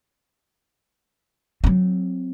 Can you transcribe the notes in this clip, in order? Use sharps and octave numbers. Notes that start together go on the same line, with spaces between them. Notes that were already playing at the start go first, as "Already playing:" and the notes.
F#3 C4